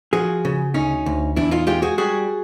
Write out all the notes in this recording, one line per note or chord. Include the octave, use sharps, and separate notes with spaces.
F3 F#4 G#4
C#3
D2 C#4 D#4
D2
E2 D4 E4
D#4 F4
G#3 F4 G4
F#4 G#4
G3 F#4 G#4